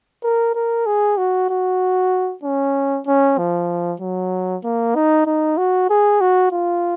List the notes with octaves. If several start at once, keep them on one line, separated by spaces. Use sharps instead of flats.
A#4
A#4
G#4
F#4
F#4
C#4
C#4
F3
F#3
A#3
D#4
D#4
F#4
G#4
F#4
F4